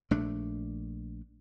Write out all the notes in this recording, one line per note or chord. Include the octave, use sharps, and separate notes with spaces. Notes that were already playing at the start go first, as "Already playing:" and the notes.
A#1 A3 D4